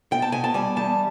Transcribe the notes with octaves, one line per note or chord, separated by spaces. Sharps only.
B2 G5
A5
B2 G#5
A5
G3 G#5
E2 A5